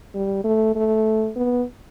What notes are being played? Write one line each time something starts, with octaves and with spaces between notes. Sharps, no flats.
G3
A3
A3
B3